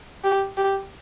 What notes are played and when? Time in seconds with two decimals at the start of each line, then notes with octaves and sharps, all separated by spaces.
0.24 G4
0.57 G4